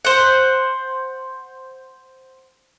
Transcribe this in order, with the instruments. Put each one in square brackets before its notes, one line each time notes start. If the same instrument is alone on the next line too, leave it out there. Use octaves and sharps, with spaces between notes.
[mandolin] C5 F#5